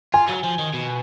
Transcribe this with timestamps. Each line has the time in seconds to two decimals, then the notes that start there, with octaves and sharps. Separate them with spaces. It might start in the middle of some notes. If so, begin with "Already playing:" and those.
0.14 F4 G#5
0.29 F#3
0.44 F3
0.59 D#3
0.74 B2